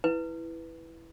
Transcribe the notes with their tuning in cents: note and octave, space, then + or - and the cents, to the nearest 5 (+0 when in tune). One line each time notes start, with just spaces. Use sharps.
E4 +0 B4 +0